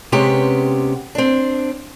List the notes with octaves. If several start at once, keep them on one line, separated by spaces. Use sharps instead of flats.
C3 G#3 B3 C#4 G4
C4 D4